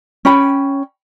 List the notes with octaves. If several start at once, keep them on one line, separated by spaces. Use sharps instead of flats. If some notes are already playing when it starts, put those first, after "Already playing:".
C#4 G5 B5